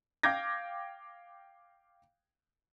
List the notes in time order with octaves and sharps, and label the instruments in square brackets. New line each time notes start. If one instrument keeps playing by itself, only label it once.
[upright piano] F5 G5 D6 G6 G#6 A#6